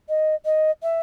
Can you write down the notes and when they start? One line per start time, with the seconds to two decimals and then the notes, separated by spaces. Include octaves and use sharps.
0.09 D#5
0.45 D#5
0.82 E5